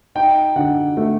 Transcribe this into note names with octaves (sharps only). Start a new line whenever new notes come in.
D#4 G5
D3 F#5
A3